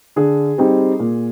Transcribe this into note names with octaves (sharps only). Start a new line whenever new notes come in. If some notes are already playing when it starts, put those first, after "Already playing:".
D3 G#4
G3 C4 D#4
A#2